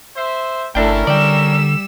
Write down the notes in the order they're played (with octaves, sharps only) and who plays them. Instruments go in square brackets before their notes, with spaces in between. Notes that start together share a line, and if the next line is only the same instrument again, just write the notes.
[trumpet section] C5 E5
[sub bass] G1 [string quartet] A3 E4 A4 [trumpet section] C#4 A#4 [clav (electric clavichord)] D4 G5
[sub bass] D3 [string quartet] G3 E6 [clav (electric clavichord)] D5 G5